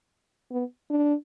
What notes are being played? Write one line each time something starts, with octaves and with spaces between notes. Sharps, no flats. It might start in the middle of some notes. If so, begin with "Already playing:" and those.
B3
D4